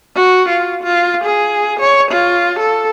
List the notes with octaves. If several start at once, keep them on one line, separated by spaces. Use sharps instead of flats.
F#4
F4
F4
G#4
C#5
F4
A4